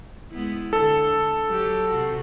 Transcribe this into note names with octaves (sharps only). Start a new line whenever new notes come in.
G#3 B3 E4
D3 A4
F#3 G4
C3 F#4